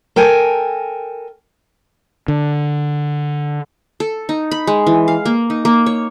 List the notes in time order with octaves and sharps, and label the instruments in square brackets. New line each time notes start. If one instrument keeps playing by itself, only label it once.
[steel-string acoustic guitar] A4 A#4 G5 G#5
[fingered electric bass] D3
[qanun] A4
D#4
B5
G#3
E3
F5
A#3
D#4
A#3
C#5